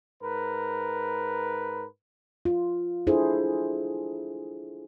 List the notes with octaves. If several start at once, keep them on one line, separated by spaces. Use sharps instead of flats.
G#2 A#4 B4
F4
D4 E4 G#4 A4 C5